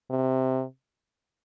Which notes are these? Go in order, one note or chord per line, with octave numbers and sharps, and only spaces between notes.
C3